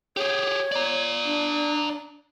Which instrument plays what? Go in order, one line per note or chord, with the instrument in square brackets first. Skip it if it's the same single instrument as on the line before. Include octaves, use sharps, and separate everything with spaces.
[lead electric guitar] G4 G#4 [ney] C#5
[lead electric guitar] D5 A#5
[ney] D4